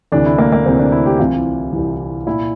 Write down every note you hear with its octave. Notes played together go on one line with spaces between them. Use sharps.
D2 C3 E3 D4
E4
A#3
A#3
D2 C3 E3 C4
D4
E4
G4
C2 C3 E3 F4
C2 C3 E3
A#2 E4